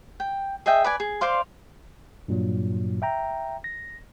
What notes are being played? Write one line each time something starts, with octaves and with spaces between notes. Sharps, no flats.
G5
G#4 D#5 E5 G5
B4 D5 G#5
G#4
C5 D5 F5 C6
G2 A#2 F#3
E5 G5 A#5
A#6